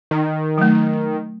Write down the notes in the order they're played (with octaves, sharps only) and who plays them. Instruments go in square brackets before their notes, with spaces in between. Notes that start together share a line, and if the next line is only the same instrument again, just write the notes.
[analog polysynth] D#3
[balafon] F#3 A3